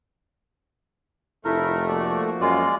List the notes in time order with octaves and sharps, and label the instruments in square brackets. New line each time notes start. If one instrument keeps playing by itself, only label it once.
[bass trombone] F1 [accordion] A3 [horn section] E4 [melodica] A#4
[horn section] F3 A#3 F#4 [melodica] D5
[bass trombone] F#2 [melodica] G#3 D5 [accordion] F4